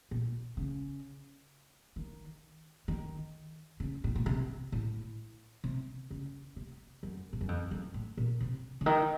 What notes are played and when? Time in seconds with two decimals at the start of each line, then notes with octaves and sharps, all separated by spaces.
0.11 A#2
0.57 C#3
1.96 D#3
2.88 D#3
3.80 C#3
4.04 A2
4.16 A#2
4.26 C3
4.72 A2
5.64 C3
6.11 C#3
6.56 C3
7.03 F#2
7.33 A2
7.41 F#2
7.48 F2
7.71 F#2
7.94 A2
8.17 A#2
8.40 C3
8.81 C#3
8.86 D#3